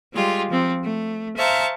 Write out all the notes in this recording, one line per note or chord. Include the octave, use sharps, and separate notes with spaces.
G3 G#3 F4 G4
F3 C4
A3
C5 E5 F5 A5 A#5 C#6